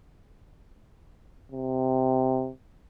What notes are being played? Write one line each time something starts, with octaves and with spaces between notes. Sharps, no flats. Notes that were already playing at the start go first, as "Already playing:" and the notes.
C3